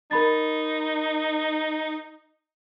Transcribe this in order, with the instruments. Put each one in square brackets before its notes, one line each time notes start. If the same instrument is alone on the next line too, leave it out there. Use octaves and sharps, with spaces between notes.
[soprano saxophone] D#4 [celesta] A#4 B5 A6